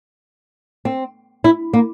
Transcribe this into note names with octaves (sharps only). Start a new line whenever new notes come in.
C4
E4
A#3